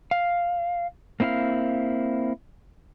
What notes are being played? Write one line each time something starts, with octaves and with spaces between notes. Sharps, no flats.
F5
A#3 C4 E4 F4 F5